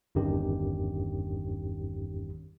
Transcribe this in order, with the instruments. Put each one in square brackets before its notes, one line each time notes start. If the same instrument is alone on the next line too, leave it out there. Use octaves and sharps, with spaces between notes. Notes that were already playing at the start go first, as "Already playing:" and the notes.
[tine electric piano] G1 E2 G2 D#3 C#4 G4